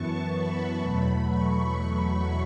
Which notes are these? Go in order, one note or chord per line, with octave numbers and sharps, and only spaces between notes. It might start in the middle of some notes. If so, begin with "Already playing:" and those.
Already playing: F#2 E3 B3 A5 C#6
B5
E2 B2 F#3 A3
C#6